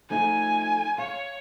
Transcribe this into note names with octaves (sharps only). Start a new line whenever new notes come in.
F3 A3 D#4 G#5
C#5 F5